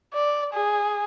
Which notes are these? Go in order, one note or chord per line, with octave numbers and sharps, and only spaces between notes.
D5
G#4